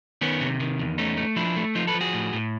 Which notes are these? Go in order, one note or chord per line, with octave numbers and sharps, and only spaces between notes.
D#3 B3 C#4
C3
D#3
E2
A3 C#4 D#4
A3
F3 D4 E4
A3
F3 D#4 F4
A4 B4
F3
F#4 G#4
A2
A2